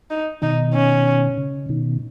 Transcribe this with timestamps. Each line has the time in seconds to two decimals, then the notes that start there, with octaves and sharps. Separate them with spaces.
0.10 D#4
0.42 B2 D#3 D#4
0.74 C#4
1.38 C#3
1.69 B2 D#3